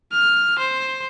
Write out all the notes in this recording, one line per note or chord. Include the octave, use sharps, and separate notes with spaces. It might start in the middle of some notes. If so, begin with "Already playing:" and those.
F6
C5